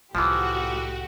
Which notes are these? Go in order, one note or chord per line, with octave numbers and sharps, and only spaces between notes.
C2 A2 E3 F3 F#4 G4